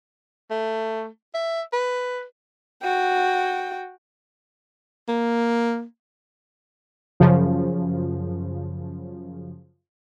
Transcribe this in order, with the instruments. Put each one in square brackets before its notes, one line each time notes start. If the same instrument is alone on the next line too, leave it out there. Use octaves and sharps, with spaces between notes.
[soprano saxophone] A3
E5
B4
[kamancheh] F#4 G5
[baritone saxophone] A#3
[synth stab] F#2 C#3 F3